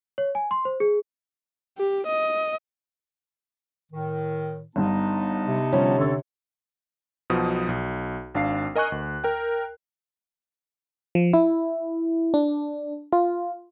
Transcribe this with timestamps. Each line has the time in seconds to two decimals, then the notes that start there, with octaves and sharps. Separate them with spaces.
0.18 C#5
0.35 G#5
0.51 C6
0.65 C5
0.80 G#4
1.78 G4
2.07 D#5
3.92 A2 D#3
4.76 G1 G2 B3 D#4 A5
5.47 C3
5.72 D3 F3 G3 C#4
5.98 D#2 D3 C4 A4 C#5
7.30 B1 B2 F3 D#6
7.69 B1
8.35 G#1 D4 F5 C7
8.76 A#4 D#5 G#5 C#6 F#6
8.92 D2
9.24 A#4 G5
11.15 F3
11.33 E4
12.34 D4
13.13 F4